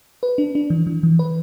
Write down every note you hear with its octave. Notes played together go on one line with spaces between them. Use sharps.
B4
D4
D4
E3
E3
E3
B4